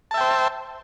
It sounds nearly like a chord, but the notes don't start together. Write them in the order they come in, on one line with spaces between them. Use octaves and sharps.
A5 E5 G5 C5